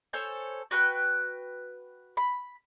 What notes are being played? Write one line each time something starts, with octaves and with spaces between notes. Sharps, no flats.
A4 C5 C#5 G#5
F#4 B4 G5 B5
B5